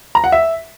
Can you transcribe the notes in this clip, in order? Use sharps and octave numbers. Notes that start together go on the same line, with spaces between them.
A#5
F#5
E5